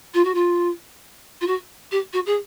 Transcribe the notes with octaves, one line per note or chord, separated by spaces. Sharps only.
F4
F#4
F4
F4
F#4
G4
F#4
G#4